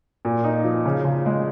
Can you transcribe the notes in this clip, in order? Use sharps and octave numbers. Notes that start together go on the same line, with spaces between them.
A#2
D#4
F3
C#3
C#3
G#3